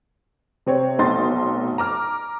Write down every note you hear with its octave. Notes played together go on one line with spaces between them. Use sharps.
C3 C4 C#5
F1 B1 D#4 C6 A6
A#5 D6 F6